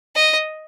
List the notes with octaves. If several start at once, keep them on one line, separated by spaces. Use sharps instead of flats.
D#5